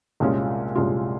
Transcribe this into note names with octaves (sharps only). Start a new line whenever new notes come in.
C2 A#2 G#3 C#4 F4
C2 A#2 G#3 C#4 F4